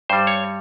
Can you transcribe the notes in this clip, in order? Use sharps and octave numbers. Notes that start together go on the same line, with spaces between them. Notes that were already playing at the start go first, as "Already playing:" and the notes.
G2 G3 C5
C#5